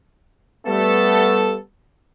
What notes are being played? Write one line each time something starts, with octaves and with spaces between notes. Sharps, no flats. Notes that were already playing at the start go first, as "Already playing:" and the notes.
G3 A3 B3 A4